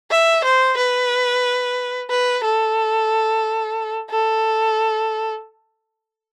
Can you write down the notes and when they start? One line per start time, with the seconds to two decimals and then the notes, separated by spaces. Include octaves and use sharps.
0.10 E5
0.44 C5
0.77 B4
2.10 B4
2.44 A4
4.10 A4